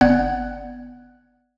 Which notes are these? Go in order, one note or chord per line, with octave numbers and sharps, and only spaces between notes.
G1 B3 D5 F#5 F#6 G#6